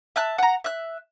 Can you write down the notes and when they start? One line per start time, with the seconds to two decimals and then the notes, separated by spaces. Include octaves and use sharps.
0.16 E5 A5 F#6
0.38 F#5 A#5
0.64 E5 F#6